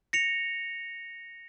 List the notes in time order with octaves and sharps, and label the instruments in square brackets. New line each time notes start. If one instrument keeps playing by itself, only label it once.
[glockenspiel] A#6 C#7 F7